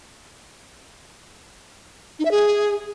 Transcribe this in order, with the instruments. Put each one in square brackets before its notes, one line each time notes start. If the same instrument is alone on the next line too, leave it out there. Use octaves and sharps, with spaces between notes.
[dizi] D#4
E5
G#4